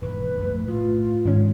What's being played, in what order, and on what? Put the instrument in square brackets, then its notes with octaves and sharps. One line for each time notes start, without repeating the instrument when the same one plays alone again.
[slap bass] E1 G#2 D#3 [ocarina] B4
[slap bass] A#1 F#2 A3
[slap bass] A2 [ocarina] F4
[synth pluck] G#2 D#3 C#4 [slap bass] G#3